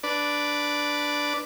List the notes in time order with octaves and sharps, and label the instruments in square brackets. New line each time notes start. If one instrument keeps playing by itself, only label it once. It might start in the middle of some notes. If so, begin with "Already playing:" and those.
[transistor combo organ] D4 B4 D5